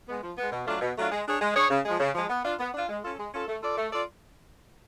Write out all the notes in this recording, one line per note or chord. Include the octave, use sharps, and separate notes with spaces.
G#3 B3
F3
G#3 B3
B2
F#3 A3 D4 F4
B2
F#3 A3 D4 F4
G#3
D4 G#4 C#5
G#3
D4 G#4 C#5
C#3
F3 G#3
C#3
F3 G#3
B3
D4 F4
B3
D4 F4
G#3
C#4 F4 A4
G#3
C#4 F4 A4
A3
F4 A4 D5
A3
F4 A4 D5